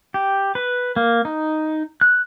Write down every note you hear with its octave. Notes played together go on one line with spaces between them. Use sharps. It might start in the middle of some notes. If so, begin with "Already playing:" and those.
G4
B4
A#3
D#4
F#6